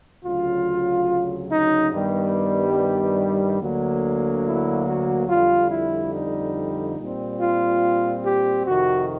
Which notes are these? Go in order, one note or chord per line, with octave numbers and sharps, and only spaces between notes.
D2 C#3 F#3 F4
D#4
G2 D#3 G3 B3
D2 D3 F#3 A#3
E4
F#4
F2 D3 G3 F4
E4
D#4
A#2 G3 C4
F4
G4
F2 C3 D#3 F#4